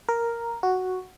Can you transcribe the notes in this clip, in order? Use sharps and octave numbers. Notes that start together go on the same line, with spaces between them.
A#4
F#4